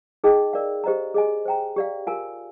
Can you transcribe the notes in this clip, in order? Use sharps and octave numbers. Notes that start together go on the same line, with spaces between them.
D#4 G#4 D#5 G5
A#4 D5 F5
G4 C5 D#5 A#5
G#4 D#5 G#5
C5 G5 A#5
G4 D5 F5
F4 A#4 F5 G#5